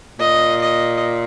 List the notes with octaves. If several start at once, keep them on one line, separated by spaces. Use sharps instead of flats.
A#2 D#5
D#5